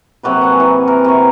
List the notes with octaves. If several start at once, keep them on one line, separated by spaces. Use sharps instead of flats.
C3 F#3 A#3 B4
F#5 G#5
E3
A#4
C3 C#6